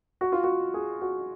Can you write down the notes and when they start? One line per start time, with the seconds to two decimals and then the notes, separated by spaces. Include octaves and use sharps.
0.21 F#4
0.32 F4
0.44 F#4
0.74 G#4
1.02 F#4